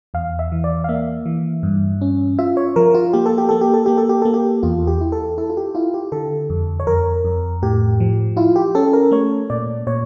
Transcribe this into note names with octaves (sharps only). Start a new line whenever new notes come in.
E2 F5
E5
E3
D5
F5
A#3 E5
E3
G2
C#4
F4 E5
C#5
F3 A#4
F4
A#3 G4
A4
G4
A#3 A4
G4
A4
A#3 G4
A4
G4
A#3 A4
G4
E2 F4
G4
E4
A4
E4 A4
F4
G4
E4 F4
G4
D3 A4
F2
C#5
F2 A#4
F2
A2 G4
F3
E4 F4
G4
C#4 A4
A#4
A3 C#5
A#2 D5
A#2 C#5